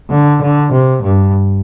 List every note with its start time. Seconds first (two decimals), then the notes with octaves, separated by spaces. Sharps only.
0.10 D3
0.41 D3
0.72 C3
1.02 G2